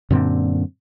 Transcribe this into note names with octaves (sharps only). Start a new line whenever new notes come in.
F#2 A#2 D3 C4